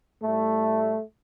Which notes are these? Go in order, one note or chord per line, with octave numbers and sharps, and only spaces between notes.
A2 G3 A3